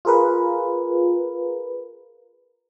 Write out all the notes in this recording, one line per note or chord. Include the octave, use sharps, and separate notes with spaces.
F4 G#4 A#4 B4